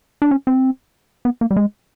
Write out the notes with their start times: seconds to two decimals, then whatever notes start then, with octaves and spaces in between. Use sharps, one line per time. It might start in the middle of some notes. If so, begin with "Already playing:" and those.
0.22 D4
0.31 C#4
0.47 C4
1.25 B3
1.41 A#3
1.51 G3
1.56 G#3